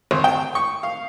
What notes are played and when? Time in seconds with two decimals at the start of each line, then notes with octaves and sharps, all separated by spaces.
0.11 G#1
0.24 G5
0.55 C#6
0.83 F5